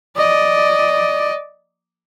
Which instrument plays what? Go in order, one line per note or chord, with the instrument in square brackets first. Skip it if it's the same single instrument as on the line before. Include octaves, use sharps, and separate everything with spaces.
[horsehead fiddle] D5 D#5